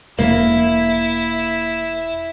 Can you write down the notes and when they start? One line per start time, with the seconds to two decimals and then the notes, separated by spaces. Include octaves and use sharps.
0.18 E1 A#3 E4